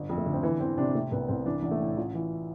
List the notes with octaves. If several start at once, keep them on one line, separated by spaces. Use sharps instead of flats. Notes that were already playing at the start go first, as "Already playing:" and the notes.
Already playing: G1
F2
A3
D3
C4
E3 B3
E3 C4
C3 D4
C3 A3
C2 B3
C2 C4
E3 D4
A1
A3
A2
A1 F4
E3